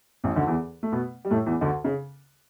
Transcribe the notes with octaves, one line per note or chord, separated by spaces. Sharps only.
A1 A2
D2 D3
E2 E3
A3
B2 B3
G3
A2 A3
E2 E3
D2 D3
C#3